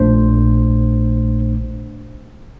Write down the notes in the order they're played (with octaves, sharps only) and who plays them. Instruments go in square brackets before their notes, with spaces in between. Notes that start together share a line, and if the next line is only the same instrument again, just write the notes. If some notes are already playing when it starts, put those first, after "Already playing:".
Already playing: [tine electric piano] A#1 A#2 A3 D4 C5